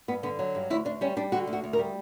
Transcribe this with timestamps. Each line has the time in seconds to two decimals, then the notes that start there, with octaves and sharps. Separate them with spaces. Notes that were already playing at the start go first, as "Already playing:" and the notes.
0.08 G2 B3
0.23 D3 B3
0.39 F#3
0.55 G2
0.70 D2 E4
0.85 D2 D4
1.01 G3 C#4
1.17 G3 D4
1.32 D3 F#4
1.47 D2
1.53 F#4
1.64 D2
1.73 A#4
1.79 G3